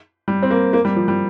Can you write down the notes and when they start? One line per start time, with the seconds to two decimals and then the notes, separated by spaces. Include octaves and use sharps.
0.28 G3
0.42 C4
0.51 A#3
0.73 A#3
0.85 G3
0.96 F3
1.08 G3